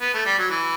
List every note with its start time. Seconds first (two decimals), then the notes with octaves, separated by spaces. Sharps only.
0.01 B3
0.13 A3
0.25 G3
0.38 F#3
0.50 E3